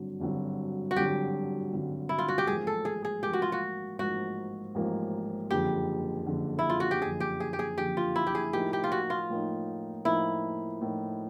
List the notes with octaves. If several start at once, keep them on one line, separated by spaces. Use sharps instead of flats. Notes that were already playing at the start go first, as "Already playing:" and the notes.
Already playing: G#1 G2 D3 F#3
G#1 G2 D3 F#3
F#4
G#1 G2 D3 F#3 G4
G#1 G2 D3 F#3
E4
F4
F#4
G4
A1 G#2 F3 A#3 G#4
A4
G#4
G#4
A1 G#2 F3 A#3 G4
F#4
F4
F#4
A1 G#2 F3 A#3 F#4
A1 G#2 F3 A#3
F#1 F2 D3 G4
F#1 F2 D3
E4
F4
F#4
G4
F#1 F2 D3 G#4
G4
G#4
G4
G#4
F#1 F2 D3 G4
F4
E4
G4
G#4
A2 F3 A#3 D#4 G4
G4
F4
F#4
F4
A2 F3 A#3 D#4
A2 F3 A#3 D#4 E4
A2 F3 A#3 D#4